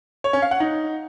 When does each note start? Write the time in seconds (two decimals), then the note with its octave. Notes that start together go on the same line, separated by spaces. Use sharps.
0.24 C#5
0.33 C#4
0.42 F5
0.51 F#5
0.60 D#4